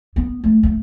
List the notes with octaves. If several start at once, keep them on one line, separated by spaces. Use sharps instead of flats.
B3
A3
A3